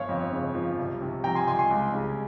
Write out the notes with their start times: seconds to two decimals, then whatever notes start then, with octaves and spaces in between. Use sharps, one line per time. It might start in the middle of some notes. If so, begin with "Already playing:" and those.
Already playing: G1 C#5 F5
0.09 F2
0.32 C#3
0.55 F3
0.78 C2
1.01 C3
1.24 F3 G5 A#5
1.35 G#5 C6
1.47 C2 G#5 C6
1.59 G#5 C6
1.70 C#2
1.93 C#3